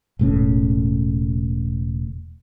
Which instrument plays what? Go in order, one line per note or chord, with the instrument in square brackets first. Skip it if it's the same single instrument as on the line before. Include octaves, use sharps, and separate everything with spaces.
[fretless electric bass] E1 A2 C#3